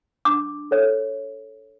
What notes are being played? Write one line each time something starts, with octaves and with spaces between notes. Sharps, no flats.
D4 D6
A4 C#5